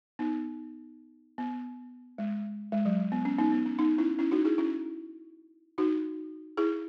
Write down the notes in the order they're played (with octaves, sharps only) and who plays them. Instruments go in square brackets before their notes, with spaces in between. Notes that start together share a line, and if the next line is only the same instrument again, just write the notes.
[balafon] B3 D#4
B3
G#3
G#3
F#3
B3
C#4
B3 D#4
B3
C#4
B3 D#4
C#4 E4
C#4 E4
D#4 F#4
E4 G#4
C#4 E4
D#4 F#4
E4 G#4